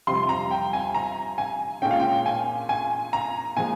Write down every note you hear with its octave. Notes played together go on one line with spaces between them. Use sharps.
F2 C3 G3 C6
A#5
G5
G#5
A#5
G#5
A#2 G#3 C#4 G5
F5
G5
G#5
G#5
A#5
A#2 F3 G#3 G#5